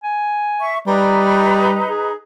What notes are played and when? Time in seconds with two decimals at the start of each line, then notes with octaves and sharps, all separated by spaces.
0.04 G#5
0.60 E5 C#6
0.86 G3 D#4 B4 D5 A#5
1.88 G#4